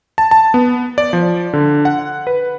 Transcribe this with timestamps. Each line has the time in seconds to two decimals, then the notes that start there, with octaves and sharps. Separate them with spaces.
0.18 A5
0.31 A5
0.54 B3
0.98 D5
1.13 F3
1.53 D3
1.85 F#5
2.27 B4